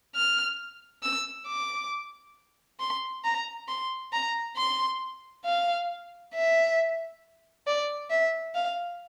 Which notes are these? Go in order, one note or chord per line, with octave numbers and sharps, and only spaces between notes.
F6
E6
D6
C6
A#5
C6
A#5
C6
F5
E5
D5
E5
F5